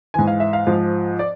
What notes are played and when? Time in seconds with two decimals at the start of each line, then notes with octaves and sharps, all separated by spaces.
0.14 G#2 E3 G#5
0.27 F5
0.40 E5
0.53 F5
0.67 G#2 F3
1.19 D5